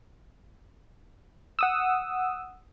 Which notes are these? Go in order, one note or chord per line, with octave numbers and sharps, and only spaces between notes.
F#5 D#6 E6